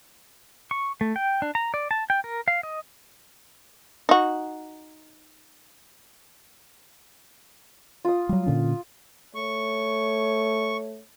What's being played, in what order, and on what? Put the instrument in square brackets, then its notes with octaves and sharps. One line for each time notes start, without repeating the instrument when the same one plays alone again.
[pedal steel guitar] C#6
A3
G5
D4
A#5
D5
A5
G5
A#4
F5
D#5
[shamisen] D#4 F#4
[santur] F4 D#6
[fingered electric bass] F#3 G3
A#2 D3 C#4
[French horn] A3 [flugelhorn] C#5 [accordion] C#6